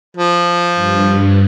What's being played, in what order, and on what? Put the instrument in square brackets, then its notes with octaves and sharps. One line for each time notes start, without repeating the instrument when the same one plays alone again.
[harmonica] F3
[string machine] G2